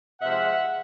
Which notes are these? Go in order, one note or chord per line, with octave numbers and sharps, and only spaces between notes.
C3 F3 G#3 E5 F#5